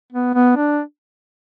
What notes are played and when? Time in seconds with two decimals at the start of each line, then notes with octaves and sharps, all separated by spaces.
0.13 B3
0.35 B3
0.57 D4